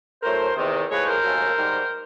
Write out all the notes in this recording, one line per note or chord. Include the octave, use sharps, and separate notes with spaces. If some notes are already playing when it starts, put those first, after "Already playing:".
A2 F#3 A3 A#4 C5
E2 C3 D#3
A2 F3 G#3 B4 C#5
A#4 C5
D#2 C#3 F#3 A3
G#2 D#3 G3